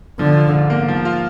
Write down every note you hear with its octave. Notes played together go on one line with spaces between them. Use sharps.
D3 F3
F4
G#2
A#3
F3
F4